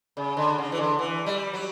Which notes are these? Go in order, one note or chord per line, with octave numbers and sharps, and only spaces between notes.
C#3
D3
C#3
E3
D3
E3
G3
F#3